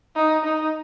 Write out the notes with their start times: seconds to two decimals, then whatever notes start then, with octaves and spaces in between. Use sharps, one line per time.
0.16 D#4
0.45 D#4